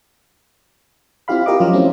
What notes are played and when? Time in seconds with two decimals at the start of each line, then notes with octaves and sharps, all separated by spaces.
1.28 C4 E4 F4 G4 F5 B5
1.46 F4 G4 A#4 D#5 F5 D6
1.60 F3 F#3 C#4 F4 A#4
1.73 A3 C4 C#4 E4